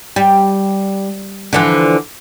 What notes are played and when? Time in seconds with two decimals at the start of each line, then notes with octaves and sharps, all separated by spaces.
0.16 G3
1.53 D3 E3 F3